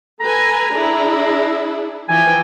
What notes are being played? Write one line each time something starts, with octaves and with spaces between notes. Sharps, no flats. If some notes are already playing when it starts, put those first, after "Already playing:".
A4 B4 G#5 A#5
D4 E4 G#4
E3 F3 G5 G#5